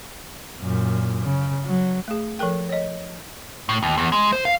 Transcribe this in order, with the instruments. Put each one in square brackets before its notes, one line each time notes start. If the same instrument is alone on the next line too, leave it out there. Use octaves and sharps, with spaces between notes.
[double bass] F#2 A#2
C#3
F#3
[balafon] A3 G#4
F3 A4 A#4 G5
C#5 D#5
[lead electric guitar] A2
D#2
E2
G#3
C5
F5